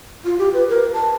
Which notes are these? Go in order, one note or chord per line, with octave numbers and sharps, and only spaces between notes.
F4
G4
B4
A#4
A5